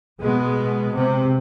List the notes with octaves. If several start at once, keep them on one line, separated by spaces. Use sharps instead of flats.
B2 G#3 B3
C3